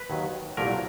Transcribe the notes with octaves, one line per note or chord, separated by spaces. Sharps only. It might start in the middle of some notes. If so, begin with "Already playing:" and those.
Already playing: B4
D#2 D#3 F#3
C2 A#2 F#3 A3 A#4